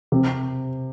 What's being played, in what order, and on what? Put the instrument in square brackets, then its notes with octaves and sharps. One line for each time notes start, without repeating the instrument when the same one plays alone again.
[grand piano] C3